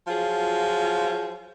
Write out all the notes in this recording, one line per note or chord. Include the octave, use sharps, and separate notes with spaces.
F3 F#3 F4 G#4